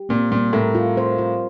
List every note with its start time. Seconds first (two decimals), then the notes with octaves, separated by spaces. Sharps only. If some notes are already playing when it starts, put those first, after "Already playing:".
Already playing: G4
0.09 A#2 C4
0.31 A#2 G3
0.53 A2 A#4
0.75 F4
0.97 C5
1.18 F4